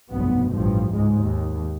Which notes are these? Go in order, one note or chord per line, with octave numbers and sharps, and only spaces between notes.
F1 B1 G2 B3
A1 G2 F3
C#2 G#2 G#3
D#2